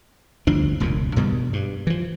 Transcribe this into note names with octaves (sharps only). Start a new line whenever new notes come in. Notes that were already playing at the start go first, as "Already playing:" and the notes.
G1 D2 F3 D4
E1 C#2 F#2 A#2
G2 B2 D#3 G3
G2
E3 F3